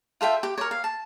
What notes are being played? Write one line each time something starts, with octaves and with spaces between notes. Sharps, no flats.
F4 A4 E5 G5
G4
A#4 C#5
F5
A5